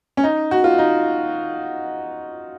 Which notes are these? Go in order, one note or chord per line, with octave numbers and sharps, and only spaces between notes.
C#4
D#4
F#4
F4
D#4